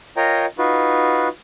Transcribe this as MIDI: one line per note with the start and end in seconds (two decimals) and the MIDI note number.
0.17 0.46 65
0.17 0.46 70
0.17 0.46 73
0.17 0.46 75
0.17 0.46 79
0.17 0.46 82
0.58 1.28 63
0.58 1.28 65
0.58 1.28 66
0.58 1.28 71